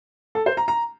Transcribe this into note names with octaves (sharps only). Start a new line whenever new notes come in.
A4
C5
A#5
A#5